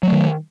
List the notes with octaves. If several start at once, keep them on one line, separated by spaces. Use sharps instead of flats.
D#3 F#3 A3